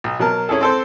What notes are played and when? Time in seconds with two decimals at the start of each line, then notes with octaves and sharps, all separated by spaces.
0.04 B1
0.19 B2 F#3 A#4 A5
0.49 C#4 E4 G#4 A4
0.61 C4 A4 C5